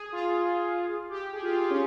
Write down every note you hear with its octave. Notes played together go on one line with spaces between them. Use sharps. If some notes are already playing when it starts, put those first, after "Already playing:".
Already playing: G#4
F4
G4
G#4
F4
G4
F4
C#4